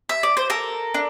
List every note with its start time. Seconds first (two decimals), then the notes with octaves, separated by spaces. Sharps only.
0.09 E5
0.23 D5
0.37 C5
0.50 A4 A#4
0.94 D4